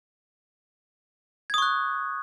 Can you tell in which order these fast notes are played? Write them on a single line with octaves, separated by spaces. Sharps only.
G#6 D#6 C#6 F#6